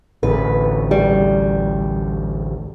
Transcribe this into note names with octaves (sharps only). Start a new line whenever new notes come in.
A1 D2 B4
G3